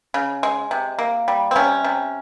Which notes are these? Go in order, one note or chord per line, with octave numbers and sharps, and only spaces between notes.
C#3
G#3
C3
A#3
G3
C4
C3 C#4
C3